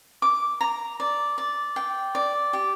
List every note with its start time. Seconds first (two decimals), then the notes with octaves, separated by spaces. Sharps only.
0.22 D6
0.61 A#5
1.00 D5
1.38 D5
1.76 G5
2.15 D5
2.53 G4